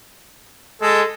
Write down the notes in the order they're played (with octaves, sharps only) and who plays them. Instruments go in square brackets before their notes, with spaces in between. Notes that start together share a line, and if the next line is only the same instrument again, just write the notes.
[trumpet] G#3 [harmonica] A4